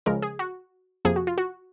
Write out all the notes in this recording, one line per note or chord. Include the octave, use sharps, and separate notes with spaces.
C#2 C#3 F3 G#3 A#4
G#4
F#4
F2 C3 F3 A#3 G#4
F#4
F4
F#4